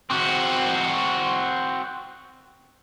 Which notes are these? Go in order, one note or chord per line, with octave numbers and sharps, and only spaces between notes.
C4 F#4